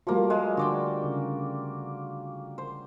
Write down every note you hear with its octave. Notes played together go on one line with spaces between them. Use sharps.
F3 G3 A3 A#3 F#4
G#3
D3 D4 F#4 D5 G5
C#3
C5